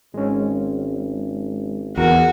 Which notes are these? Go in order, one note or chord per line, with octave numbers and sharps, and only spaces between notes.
G#1 G#3 C#4
E2 F#4 G#4 A#4